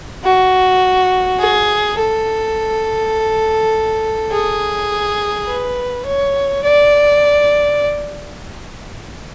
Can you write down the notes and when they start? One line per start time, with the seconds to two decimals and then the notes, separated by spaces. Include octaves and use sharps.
0.24 F#4
1.40 G#4
1.99 A4
4.32 G#4
5.47 B4
6.06 C#5
6.64 D5